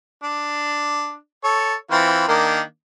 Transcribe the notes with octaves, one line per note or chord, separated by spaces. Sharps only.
D4
A4 C#5
E3 C4 F4
D#3 A#3 D4